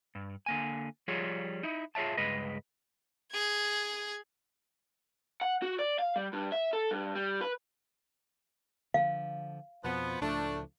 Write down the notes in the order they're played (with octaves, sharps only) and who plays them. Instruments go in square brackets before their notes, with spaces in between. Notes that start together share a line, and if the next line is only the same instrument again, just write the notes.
[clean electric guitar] G2
D3 A#3 G#5
F3 G3 F4 G#4 C#5
D#4 E4
F4 G#4 C#5 E5 A5
C#2 G2 G#3 B4 D#5
[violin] G#4 G#6
[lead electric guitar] F#5
F#4
D5
F5
G3
G2
E5
A4
G2
G3
B4
[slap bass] D3 F3 [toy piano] F5
[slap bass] F2 B2 [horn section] F3 B3
[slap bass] C#2 A2 F3 [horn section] A3 D4